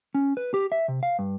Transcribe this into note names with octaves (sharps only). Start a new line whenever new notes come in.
C#4
B4
G4
E5
C3
F5
G2